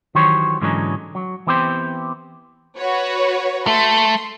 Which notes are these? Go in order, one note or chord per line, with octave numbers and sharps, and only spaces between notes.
D#3 E3 F#3 G4 C5 C#5
G#2 D3 E3 F#3 C#4 D#4
F#3
E3 B3 C4 G4 A4 C5
F#4 B4 C#5
A3 C6